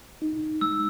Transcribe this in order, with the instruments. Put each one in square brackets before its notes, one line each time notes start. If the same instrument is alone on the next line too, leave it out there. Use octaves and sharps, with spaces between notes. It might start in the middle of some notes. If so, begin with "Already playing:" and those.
[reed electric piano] D#4
[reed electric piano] G#3 [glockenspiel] E6